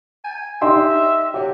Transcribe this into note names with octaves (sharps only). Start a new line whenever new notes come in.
G#5
D#4 G4 E5 C6
F#3 G4